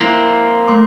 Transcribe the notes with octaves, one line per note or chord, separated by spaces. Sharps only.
A#3 C4 E4
A3 C6 D6